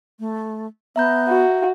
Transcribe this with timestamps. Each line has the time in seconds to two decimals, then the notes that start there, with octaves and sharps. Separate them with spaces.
0.19 A3
0.96 B3 E5 A#5 G6
1.28 F#4